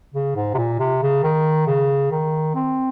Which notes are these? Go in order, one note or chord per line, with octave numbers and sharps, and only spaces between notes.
C#3
G#2
C3
A#2
C3
C#3
D#3
C#3
D#3
C4